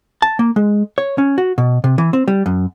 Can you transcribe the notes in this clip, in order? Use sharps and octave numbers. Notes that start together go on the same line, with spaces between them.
A5
A#3
G#3
C#5
C#4
F#4
B2
C3
E3
C4
G3
F#2